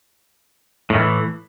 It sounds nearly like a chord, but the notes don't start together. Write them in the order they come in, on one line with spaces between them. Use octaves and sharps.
A2 D#3 E3